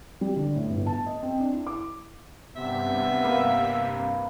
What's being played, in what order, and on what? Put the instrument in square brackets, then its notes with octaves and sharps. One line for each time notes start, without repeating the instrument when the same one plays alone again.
[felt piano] G3
D3
A2
G1
A5
D#5
C4
D4
E4
D6
[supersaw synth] G2 C3 [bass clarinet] B3 [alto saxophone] E5
[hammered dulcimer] A#3 B4 F5